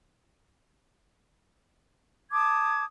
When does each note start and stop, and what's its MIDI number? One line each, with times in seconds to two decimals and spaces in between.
2.32 2.84 81
2.32 2.84 86
2.32 2.84 87
2.32 2.84 92